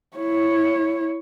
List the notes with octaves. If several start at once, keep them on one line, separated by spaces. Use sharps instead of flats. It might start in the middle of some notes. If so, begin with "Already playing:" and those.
E4 C#5